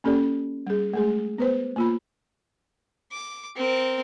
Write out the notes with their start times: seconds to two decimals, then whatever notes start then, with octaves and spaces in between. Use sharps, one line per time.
0.04 A#3 C#4 G4 A4 D5
0.66 G3 G#4
0.94 G#3 A3 G#4
1.38 B3 B4 C5
1.76 A#3 F4 B5
3.12 D6
3.56 C4 A#4